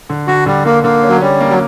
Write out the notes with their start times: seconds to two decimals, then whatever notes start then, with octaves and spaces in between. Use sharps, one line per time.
0.09 D3
0.28 D3 F#4
0.46 D3 G3
0.65 D3 A#3
0.84 D3 A#3
1.03 C#4
1.09 F#3
1.21 G3 C#4
1.41 A#3
1.50 F#3